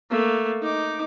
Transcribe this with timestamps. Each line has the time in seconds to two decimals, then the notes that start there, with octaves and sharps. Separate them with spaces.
0.11 A3 A#3
0.62 D#4 D6